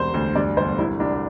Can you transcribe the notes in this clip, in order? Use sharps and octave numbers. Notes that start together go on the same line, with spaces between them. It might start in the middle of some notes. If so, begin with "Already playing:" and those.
Already playing: E1 C2 C5
D2
G2 D5
G1 C5
C2 E4
C2 D4